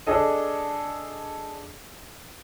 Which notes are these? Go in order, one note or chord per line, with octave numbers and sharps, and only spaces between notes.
D4 G#4 A4 D#5